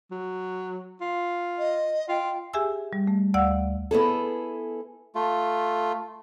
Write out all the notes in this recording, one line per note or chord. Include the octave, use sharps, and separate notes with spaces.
F#3
F4
D#5
F4 G5
G4 G#4 E5 G#5 E6
G3
A3
D2 D5 F5 F#5 E6
B3 E4 G#4 A4
A3 F4